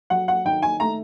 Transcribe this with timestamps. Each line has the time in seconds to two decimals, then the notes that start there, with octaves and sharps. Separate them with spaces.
0.10 F#3 F#5
0.28 F#5
0.45 D#3 G5
0.62 G#5
0.80 A3 A#5